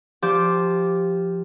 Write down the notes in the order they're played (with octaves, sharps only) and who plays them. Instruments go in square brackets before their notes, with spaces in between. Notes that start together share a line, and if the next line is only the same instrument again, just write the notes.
[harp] F3 G4 D6 G6